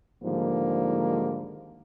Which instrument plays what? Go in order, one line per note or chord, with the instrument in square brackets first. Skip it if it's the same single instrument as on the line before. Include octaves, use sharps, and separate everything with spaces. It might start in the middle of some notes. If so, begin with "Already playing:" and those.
[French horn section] G#2 D3 D#3 F3 G3 A#3